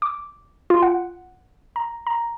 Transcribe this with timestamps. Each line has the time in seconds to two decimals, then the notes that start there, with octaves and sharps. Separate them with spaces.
0.02 D6
0.70 F4
0.82 F#5
1.76 A#5
2.07 A#5